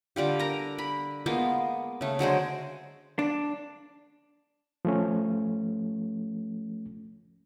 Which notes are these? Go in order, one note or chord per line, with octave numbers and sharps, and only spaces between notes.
D3 G3 F4 G4
A#4 A#5
B5
G#3 A#3 B3 F4
C#3 A3
D3 F#3 G#3 C5
D4
F3 A3 C#4